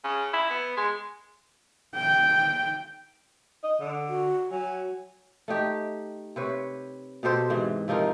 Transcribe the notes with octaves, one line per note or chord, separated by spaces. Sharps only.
C#3
E4
B3
G#3
G5
D#5
D3
F#4
F#3 G#5
A3 D#4 G4
C3 B4 C#5
B2 G4 A4 C5
G#2 C3 E3
C3 F3 D#4 A#4